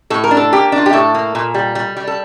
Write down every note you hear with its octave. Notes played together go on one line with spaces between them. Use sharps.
A2 A4
A#4
D4
A4
A#3 G4
D4
F4
G4
A2 A4
A#3
A#2
G3
G3
G3
A4